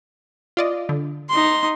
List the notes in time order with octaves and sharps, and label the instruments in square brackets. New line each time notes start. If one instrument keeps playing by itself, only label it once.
[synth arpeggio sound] F4 D5 D#5
D3
[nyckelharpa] D#4 C6